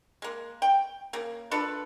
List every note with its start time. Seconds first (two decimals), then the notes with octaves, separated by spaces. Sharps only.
0.22 G#3 A#3
0.62 G5
1.13 C#3 A#3
1.51 D4 F4 A4 B4